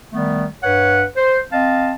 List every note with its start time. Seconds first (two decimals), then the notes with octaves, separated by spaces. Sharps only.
0.13 D#3 G3 A3 B3
0.63 G2 B4 C#5 F#5
1.17 C5
1.53 C4 D#5 F5 A5